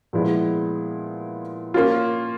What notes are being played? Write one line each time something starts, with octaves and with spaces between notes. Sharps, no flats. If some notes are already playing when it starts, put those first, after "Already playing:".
A#2 F3 G#3 B3 E4
A#3 C#4 F4